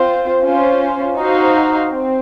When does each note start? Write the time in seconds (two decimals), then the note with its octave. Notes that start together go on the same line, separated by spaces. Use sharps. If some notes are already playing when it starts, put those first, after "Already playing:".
Already playing: C4 F4 C5
0.44 C#4 F4 C5
1.18 D#4 F#4 C5 F5
1.91 C4